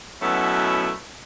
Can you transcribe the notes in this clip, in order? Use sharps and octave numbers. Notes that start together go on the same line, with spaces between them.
F#2 B2 F#3 A3 B3 E4